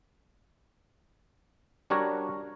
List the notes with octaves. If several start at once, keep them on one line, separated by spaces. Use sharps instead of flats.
G3 D4 F#4 A#4 C#5